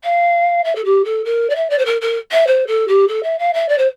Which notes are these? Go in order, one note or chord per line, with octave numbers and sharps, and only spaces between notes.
F5
E5
A4
G4
A4
A#4
D5
E5
D5
C5
A#4
A#4
E5
C5
A4
G4
A4
E5
F5
E5
D5
C5